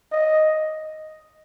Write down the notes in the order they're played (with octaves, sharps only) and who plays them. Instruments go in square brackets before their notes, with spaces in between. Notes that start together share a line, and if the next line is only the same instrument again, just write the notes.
[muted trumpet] D#5